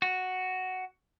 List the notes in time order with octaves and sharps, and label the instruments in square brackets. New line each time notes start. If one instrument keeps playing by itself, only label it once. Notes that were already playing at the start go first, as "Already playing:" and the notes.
[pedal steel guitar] F#4